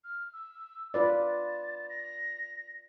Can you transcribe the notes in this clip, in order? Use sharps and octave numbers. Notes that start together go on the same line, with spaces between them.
F6
E6
F4 B4 D5 A6
A#6